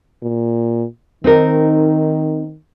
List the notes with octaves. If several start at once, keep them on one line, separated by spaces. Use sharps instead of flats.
A#2
D#3 C4 D#4 A#4